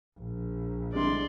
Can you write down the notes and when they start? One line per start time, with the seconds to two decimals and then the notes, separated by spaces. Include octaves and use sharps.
0.19 A#1
0.94 C2 D3 G#3 D5 C6